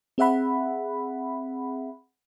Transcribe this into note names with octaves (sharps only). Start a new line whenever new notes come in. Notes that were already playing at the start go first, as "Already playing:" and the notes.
C4 G#4 E5 F#5 B5